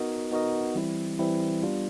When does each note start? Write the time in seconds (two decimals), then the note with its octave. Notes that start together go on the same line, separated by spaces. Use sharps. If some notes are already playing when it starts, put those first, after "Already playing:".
Already playing: B3 D#4 F#4 A#4 D#5
0.31 B3 D#4 F#4 A#4 D#5
0.75 E3 G3 C4 E4
1.19 E3 G3 C4 E4
1.63 G3 B3 D4 F4